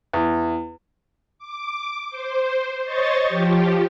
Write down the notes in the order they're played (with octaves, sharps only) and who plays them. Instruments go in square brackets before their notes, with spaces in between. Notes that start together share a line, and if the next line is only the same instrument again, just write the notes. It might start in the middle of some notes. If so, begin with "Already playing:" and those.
[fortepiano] E2
[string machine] D6
C5
C5 C#5 D#5 C#6 A6
F3 G4